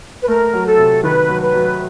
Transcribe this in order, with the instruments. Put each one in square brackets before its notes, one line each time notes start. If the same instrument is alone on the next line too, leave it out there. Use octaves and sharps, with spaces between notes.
[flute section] B4
[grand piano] A3 [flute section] A#4
[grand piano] F#3
[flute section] A4
[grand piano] C3
[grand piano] D#3 [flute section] B4
[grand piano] F#3
[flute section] B4
[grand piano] F#3